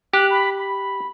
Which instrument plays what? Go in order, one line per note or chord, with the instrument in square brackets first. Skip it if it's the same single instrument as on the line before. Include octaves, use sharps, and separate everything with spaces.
[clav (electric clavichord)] G4 [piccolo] F#6
[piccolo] B5
B5